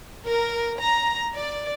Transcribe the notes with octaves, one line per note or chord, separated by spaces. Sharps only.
A#4
A#5
D5